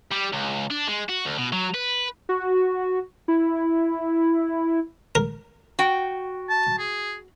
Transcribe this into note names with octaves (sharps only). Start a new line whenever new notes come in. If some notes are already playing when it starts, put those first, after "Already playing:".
G3
C#2
D4
G#3
F#4
D2
B2
F#3
B4
F#4
E4
A#4
F#4 G5
A5
G#4